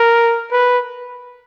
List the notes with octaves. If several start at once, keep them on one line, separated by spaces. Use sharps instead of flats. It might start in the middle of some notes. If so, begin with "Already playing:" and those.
Already playing: A#4
B4